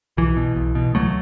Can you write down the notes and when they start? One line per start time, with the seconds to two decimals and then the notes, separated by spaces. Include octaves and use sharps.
0.17 B1 E3
0.37 B2
0.56 B1
0.75 B2
0.95 C#2 F#3 A3